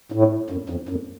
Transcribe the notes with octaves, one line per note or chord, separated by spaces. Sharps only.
A2
F#2
F2
F#2